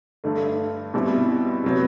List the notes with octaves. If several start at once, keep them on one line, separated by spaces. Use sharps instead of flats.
G2 D3 A3
B2 G3 C4 E4
C3 F#3 B3